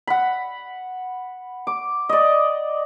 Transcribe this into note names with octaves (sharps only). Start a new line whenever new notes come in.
F#5 B5
D6
D5 D#5